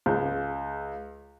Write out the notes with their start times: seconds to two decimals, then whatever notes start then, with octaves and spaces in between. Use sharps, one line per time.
0.06 C#2